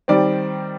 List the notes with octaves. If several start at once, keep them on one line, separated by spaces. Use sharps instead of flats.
D#3 G3 C4 D5